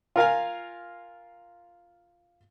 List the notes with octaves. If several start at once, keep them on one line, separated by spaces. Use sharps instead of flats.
F4 A#4 F5 G#5